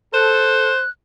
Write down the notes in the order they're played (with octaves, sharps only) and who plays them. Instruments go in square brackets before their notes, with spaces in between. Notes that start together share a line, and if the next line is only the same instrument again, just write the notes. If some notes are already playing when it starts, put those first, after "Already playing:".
[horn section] A4 [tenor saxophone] C5 [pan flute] F#6